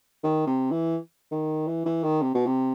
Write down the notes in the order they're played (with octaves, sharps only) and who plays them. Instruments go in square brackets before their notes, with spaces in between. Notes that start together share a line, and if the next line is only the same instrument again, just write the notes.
[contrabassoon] D#3
C3
E3
D#3
E3
E3
D#3
C3
B2
C3